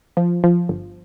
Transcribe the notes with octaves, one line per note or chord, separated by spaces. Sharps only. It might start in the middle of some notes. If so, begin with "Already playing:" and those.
F3
F3
G1